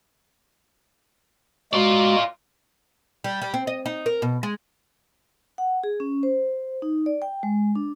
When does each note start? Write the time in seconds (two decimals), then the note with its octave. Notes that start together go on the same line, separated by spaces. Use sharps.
1.73 G#3 F4 F#4 D5
3.24 G3
3.42 G3
3.54 C4
3.67 D#5
3.86 D#4
4.06 A#4
4.22 B2
4.43 G#3
5.58 F#5
5.84 G#4
6.00 C#4
6.23 C5
6.82 D#4
7.06 D5
7.22 G5
7.43 G#3
7.76 D4